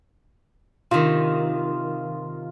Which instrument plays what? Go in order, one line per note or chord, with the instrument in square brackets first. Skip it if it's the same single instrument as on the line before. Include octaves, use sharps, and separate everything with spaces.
[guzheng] C3 D#3 [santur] F4